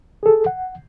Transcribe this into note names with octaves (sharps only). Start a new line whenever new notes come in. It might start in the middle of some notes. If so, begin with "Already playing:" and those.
G#4 A4
F#5